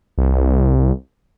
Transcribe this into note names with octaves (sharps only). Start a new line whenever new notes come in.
C2